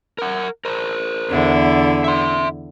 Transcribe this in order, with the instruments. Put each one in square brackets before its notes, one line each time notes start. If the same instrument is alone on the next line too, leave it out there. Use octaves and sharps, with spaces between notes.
[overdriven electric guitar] A#4 F#5
A#4 C5
[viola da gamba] E2 D3 E4
[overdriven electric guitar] E5 C6